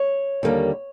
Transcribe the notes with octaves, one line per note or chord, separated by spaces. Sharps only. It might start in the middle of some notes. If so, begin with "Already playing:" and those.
Already playing: C#5
D#2 D3 G3 A#3